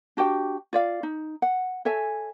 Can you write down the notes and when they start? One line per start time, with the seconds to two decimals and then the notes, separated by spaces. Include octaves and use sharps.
0.17 D4 F#4 G4 G5
0.73 F4 D5 F5
1.03 D#4
1.42 F#5
1.85 A4 C#5 E5 G#5